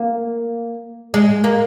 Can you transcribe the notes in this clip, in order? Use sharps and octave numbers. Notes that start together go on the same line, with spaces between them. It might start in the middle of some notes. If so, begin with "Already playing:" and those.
Already playing: A#3
G#3
A#3